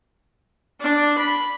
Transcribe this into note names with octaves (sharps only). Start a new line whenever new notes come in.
D4
B5